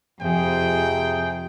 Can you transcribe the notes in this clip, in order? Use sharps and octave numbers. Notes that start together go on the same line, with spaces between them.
F2 C3 G#4 G5